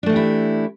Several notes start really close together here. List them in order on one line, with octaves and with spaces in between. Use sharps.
D4 A3 E3 G4 E4